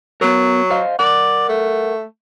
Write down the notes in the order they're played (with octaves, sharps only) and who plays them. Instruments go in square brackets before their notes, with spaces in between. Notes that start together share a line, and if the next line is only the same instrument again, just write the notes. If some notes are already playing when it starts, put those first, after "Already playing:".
[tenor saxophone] F#3 [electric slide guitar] B3 A#4
[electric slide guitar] C5 D#5 F5
[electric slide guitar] A#4 F#5 [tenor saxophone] D5
[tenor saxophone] A3